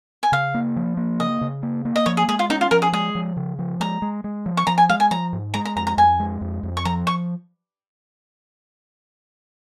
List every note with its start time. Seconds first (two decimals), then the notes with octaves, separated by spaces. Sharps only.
0.23 G#5
0.32 C#3 F5
0.54 A#3
0.76 F3
0.97 A#3
1.20 C#3 D#5
1.41 C#3
1.63 A#3
1.85 A#3
1.96 D#5
2.06 F3 C#5
2.17 G#4
2.28 G#3 G#4
2.39 F4
2.50 C#4 D#4
2.61 F4
2.71 F3 A#4
2.82 G#4
2.93 G#3 G#4
3.15 F3
3.36 C#3
3.59 F3
3.80 G#3 A#5
4.02 G#3
4.24 G#3
4.46 F3
4.57 C#6
4.67 F3 A#5
4.78 G#5
4.89 G#3 F5
5.00 G#5
5.11 F3 A#5
5.33 G#2
5.54 G#3 A#5
5.65 A#5
5.76 F2 A#5
5.87 A#5
5.97 F2 G#5
6.20 G#3
6.41 F2
6.63 F2
6.77 C#6
6.85 F3 A#5
7.07 C#6